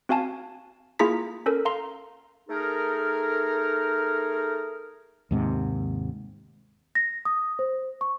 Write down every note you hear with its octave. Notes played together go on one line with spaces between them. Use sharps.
C4 F#4 F5 G#5 A5
A#3 E4 F4 G#4 A#5 B6
C#4 A4 A#4
F5 A#5 C6
A3 D#4 G#4 A#4
D#2 G#2 C3
A#6
D#6
C5
C#6